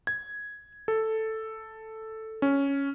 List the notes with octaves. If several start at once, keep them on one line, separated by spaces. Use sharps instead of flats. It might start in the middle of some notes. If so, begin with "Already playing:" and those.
G#6
A4
C#4